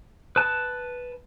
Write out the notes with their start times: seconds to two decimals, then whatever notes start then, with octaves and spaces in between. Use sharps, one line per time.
0.36 B4 A5